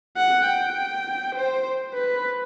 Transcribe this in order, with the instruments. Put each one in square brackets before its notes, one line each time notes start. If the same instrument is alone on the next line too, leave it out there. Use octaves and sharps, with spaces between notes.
[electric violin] F#5
G5
C5
B4